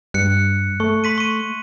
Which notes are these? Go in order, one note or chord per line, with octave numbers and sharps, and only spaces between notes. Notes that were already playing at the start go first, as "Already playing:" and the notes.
G2 F#6 C#7
A3 C#6
C6 B6 D#7
C#6 D#7